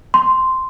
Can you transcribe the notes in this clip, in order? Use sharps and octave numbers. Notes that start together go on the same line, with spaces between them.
C6